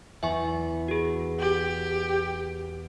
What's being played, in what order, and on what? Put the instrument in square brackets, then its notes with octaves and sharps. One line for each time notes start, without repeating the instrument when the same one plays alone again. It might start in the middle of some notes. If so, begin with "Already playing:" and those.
[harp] E2 [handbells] E5 G#5 C#6
[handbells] F#4 G#4
[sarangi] G4